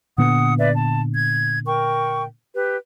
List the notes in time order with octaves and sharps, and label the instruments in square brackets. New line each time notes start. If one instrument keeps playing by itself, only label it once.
[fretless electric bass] A#2 D3 B3 [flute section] F#5 D#6
[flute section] B4 D5 E5
A5
G#6
A#4 G5 C#6
G4 B4